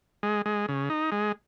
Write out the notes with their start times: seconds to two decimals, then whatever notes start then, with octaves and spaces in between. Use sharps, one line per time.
0.23 G#3
0.46 G#3
0.69 C#3
0.90 D#4
1.12 G#3